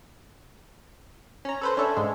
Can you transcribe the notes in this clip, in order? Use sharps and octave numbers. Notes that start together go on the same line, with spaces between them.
C#4 A#5
A4 B4 C5
C#4 D4 A4 E5
G#2 G#3